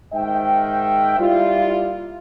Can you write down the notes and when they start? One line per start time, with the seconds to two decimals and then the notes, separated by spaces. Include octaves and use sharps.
0.13 G#2 D#3 E5 G5
1.18 G3 A#3 E4 F4